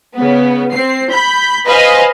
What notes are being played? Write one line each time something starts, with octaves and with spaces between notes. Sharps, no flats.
C#3 B3
C4 C7
B5 G6
B4 C5 D#5 F5 G#5